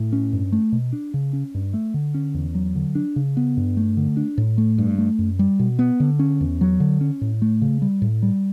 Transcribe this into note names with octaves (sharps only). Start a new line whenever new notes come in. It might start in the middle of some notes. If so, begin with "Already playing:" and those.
Already playing: A2
C#4
G2
A3
B2
D4
C#3
C#4
G2
A3
D3
C#4
E2
F#3
D3
D4
C#3
B3
G2
A3
D3
D4
A2
A3
G2
A3
F#2
G3
B2
B3
D3
C#4
E2
F#3
D3
C#4
A2
A3
C#3
G3
A2
G3